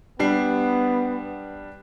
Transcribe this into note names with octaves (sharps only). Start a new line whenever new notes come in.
G3 B3 D4 C7